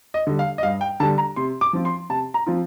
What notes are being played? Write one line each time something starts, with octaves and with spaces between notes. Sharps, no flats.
D#5
D3 G3
F5
D#5
G2 F5
G5
D3 G3 A5
A#5
C3 C6
D6
F3 C4 F4
C6
C3 A5
A#5
F3 C4 F4